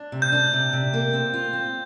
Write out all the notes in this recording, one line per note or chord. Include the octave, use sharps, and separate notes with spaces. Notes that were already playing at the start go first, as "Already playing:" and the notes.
Already playing: D4
C3
G6
D4
C3
C3
A#3
C4
F4
C4